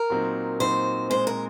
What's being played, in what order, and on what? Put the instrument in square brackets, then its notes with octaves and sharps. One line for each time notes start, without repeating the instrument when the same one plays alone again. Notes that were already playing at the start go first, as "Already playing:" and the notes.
Already playing: [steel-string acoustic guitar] A#4
[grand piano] A#2 F#3 C4 D#4
[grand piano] A#2 F#3 C4 D#4 [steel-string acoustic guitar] C5
[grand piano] A#2 G#3 C4 [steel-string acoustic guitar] C5
[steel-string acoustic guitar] A#4